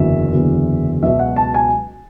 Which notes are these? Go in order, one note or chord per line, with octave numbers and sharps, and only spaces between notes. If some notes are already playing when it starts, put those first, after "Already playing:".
Already playing: F#1 E2 D3 F#3 E5
F#1 E2 D3 F#3
C#2 B2 F#3 E5
F#5
A5
G#5